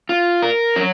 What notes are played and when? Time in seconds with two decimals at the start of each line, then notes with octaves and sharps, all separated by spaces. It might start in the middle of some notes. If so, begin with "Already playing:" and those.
0.09 F4
0.42 A#4
0.76 F#3